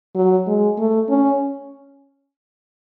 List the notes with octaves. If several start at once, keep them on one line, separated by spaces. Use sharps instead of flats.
F#3
G#3
A3
C#4